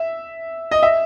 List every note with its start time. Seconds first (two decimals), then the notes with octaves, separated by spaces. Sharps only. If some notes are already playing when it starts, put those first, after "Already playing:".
Already playing: E5
0.71 D#5
0.83 E5